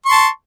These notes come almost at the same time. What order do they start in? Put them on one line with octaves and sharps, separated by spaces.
C#6 C6 A5